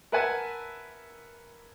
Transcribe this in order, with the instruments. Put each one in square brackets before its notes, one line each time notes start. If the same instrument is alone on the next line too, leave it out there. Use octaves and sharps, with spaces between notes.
[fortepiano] A#4 B4 E5 F#5 G#5 A5